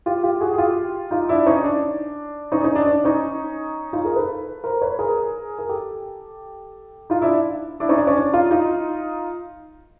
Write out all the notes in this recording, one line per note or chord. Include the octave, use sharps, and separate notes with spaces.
F4 G4
F4 G4
F#4 G#4
G#4
F4 G4
D#4 F4
D4 E4
C#4 D#4
D4
C#4 D#4
C#4 D#4
D4
D4
C#4 D#4
D#4 F4
G#4 A#4
A4 B4
A#4 C5
B4 C#5
G#4 A#4
A#4
G4 A4
D#4 F4
D4 E4
D4 E4
C#4 D#4
D4
C#4
D4
D#4 F4
D#4 F4